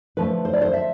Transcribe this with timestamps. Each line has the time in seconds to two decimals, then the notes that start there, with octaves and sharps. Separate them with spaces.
0.17 D3 F3 A3 B4
0.45 C5
0.53 D5
0.61 C5
0.73 E5